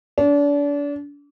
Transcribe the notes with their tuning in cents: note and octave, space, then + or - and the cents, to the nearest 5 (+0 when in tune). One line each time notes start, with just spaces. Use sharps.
D4 -35